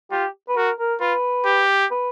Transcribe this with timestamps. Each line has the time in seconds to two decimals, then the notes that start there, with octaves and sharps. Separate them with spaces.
0.11 F4 G4
0.49 B4
0.56 F#4 A#4
0.79 A#4
1.01 F4 B4
1.46 G4
1.91 B4